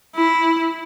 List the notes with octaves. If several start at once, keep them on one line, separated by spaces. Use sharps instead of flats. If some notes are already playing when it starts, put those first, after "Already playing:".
E4